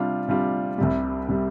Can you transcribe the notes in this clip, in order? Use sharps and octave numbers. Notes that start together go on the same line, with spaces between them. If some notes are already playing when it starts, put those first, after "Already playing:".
Already playing: C3 G3 D4 F4
C3 G3 D4 F4
C2 C3 G3
C3 G3